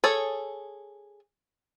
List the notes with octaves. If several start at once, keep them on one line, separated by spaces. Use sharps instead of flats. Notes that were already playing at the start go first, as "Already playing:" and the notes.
G#4 A4 C#5